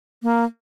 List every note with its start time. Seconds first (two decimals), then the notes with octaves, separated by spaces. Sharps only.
0.23 A#3